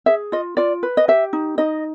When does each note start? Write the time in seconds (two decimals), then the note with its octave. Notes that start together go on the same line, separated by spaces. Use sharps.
0.06 G#4 E5
0.32 F4 D#5
0.57 F4 D5
0.83 B4
0.97 D#5
1.08 G4 E5
1.33 D#4
1.58 D#4 D#5